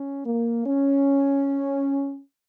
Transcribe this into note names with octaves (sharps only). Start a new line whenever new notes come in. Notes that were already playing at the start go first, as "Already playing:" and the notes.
Already playing: C#4
A#3
C#4